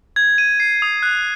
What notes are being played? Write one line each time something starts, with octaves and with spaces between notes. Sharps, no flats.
G#6
D#7
C7
D#6
F#6